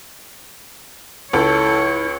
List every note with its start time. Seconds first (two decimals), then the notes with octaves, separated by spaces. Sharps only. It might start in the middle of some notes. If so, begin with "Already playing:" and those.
1.33 C#2 E4 A4 C#5